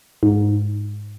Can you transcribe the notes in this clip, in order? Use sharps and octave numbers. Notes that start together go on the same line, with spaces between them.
G#2